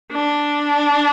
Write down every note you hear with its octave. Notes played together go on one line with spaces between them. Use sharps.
D4